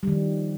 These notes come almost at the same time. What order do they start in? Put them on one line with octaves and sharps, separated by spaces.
G3 D#3 F3